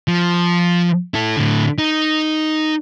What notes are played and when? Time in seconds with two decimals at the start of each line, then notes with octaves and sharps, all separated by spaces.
0.08 F3
1.14 E4 A4
1.37 A2 D3
1.78 D#4